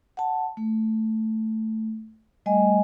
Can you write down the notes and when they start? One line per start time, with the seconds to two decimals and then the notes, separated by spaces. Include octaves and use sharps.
0.17 F#5 A5
0.57 A3
2.46 G3 A3 D#5 G#5